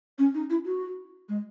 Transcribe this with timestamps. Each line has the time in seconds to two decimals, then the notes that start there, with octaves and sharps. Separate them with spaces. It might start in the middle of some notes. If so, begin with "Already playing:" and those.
0.18 C#4
0.34 D#4
0.50 E4
0.65 F#4
1.28 G#3